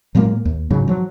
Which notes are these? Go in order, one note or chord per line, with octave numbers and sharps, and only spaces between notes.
A2 F#3 G#3 A#3
D#2
G#2 C#3 F#3
F3 F#3